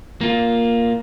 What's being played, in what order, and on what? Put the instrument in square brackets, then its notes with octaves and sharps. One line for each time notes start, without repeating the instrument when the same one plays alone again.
[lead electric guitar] A#3 F4